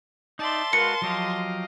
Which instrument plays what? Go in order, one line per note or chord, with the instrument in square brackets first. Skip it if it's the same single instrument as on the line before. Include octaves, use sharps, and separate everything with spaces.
[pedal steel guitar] D#4 [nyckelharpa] D5 E5 [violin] A5 C6
[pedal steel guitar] G#3 F#4 B4 [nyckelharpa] A#4 F5 [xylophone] C#7
[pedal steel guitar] F3 F#3 G4 [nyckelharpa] D#5 F5